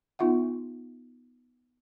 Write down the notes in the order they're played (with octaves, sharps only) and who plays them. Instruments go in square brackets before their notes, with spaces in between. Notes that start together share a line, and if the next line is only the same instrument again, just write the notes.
[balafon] B3 D#4 F4 E5 F#5